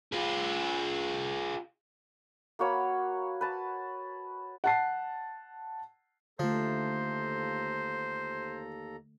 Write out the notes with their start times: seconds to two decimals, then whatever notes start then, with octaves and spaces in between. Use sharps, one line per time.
0.12 F4 G#4
2.59 A#3 F#4 C#5 B5
3.41 B4 A5
4.64 F#5 A5 C7
6.39 D#2 D3 F3 A3 A4 C5 A#5